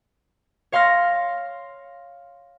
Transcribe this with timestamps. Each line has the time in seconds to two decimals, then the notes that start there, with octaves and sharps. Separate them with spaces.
0.72 C#5 F5 C6 F6 A#6